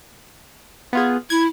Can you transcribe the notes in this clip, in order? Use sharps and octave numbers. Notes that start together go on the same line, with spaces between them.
B3 F4 G#4
E4 G#6